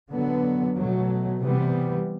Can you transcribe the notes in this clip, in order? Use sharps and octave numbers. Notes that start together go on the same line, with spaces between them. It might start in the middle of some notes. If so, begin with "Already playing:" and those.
D3 F#3 B3
B2 F#3 A3
C3 E3 G3 B3